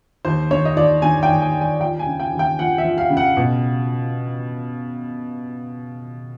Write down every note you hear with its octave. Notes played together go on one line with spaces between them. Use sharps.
D#2 C5
D#3 C#5
D#5
D#2 D5
D#3 G#5
G5
D#2
G#5
D#2
G#5
F3 G5
G#5
C#3
G5
D#2
G5
F3 F#5
E5
F3
F5
C#3
F#5
B2